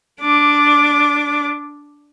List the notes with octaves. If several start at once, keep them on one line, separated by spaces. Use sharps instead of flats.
D4 D6